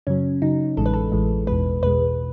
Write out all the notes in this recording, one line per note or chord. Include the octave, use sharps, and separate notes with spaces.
F#2 C#3 F#3 C#4
F#2 C#3 F#3 D#4
A1 A2 E3 G#3 A4
B4
A4
A1 A2 E3 G#3
E2 B2 G#3 B4
E2 B2 G#3 B4